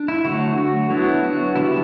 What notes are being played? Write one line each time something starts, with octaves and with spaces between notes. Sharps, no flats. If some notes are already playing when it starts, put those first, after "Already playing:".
Already playing: D4
E4
D3 F#3 A3 F#4
F#4
F#3 B3 D4 E4
F#4
D3 G3 B3 D4 E4